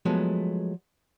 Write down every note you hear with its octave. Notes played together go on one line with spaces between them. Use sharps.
F3 F#3 G#3 A3 B3